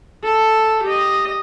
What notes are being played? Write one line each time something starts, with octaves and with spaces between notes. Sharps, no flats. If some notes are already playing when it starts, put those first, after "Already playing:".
A4
G4 D#5